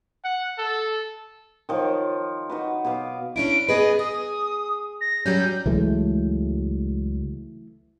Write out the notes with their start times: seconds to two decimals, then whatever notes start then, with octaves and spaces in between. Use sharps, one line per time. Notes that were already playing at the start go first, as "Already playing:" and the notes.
0.25 F#5
0.58 A4
1.69 D#3 F3 C#5 D6
2.50 D#4 F#4 B4
2.85 B2 B4 F5 D6
3.36 C#4 D4 E4 D7
3.69 B3 G#4 B4 D#5
3.99 G#4 D#6
5.01 A#6
5.26 F#3 G3 C#4 G6
5.66 C#2 E3 F#3 G#3 A3